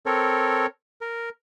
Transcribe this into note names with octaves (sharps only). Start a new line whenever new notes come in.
C4 A4 A#4 C#5
A#4